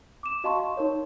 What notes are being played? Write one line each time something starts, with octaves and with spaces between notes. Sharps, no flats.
D6 E7
F#4 D#5 F5 A5 C6 C#6
D#4 A#4 C#5